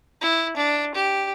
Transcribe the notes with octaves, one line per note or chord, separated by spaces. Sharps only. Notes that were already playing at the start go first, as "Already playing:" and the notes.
E4
D4
G4